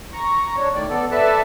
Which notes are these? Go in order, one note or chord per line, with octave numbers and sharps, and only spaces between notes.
A#5 C#6
D4 C#5
A2 D#3 D5
B3 A4 D5
A4 B4 D5 E5 A5